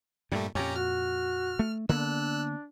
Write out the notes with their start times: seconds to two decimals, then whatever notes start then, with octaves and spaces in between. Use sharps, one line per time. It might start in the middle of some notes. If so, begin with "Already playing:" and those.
0.32 G2 A#2 G3 A3
0.55 F2 A#2 C#4 G4 A#5
0.76 F#4 F6
1.59 A3
1.89 D3 A#3 B3 D4 E6 F#6